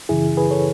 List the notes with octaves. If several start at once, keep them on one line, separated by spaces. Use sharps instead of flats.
F#2 C#3 E3 E4 G#4
G#4 B4
A4 C#5